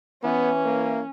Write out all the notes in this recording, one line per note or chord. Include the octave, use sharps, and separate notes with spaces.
E3 B3 C#4
A#3